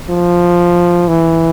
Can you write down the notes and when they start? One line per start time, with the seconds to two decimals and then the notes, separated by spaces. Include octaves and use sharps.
0.10 F3
1.08 E3